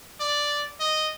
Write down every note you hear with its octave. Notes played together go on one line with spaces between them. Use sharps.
D5
D#5